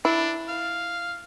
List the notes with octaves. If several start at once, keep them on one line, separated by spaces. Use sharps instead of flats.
D4 E4
F5